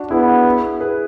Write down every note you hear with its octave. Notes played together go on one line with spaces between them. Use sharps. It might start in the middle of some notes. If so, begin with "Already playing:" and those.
Already playing: D4 F#4
B3 E4 G#4
G#4 B4